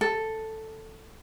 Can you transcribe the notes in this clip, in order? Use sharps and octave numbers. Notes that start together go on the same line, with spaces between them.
A4